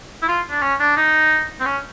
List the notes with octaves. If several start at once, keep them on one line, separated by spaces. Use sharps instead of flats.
E4
F4
D4
C#4
D4
D#4
C4
C#4